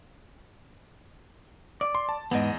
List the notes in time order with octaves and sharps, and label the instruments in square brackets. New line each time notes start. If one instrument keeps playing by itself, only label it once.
[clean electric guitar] D5
[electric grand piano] C6
A5
[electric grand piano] E2 D#5 [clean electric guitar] G#2 B3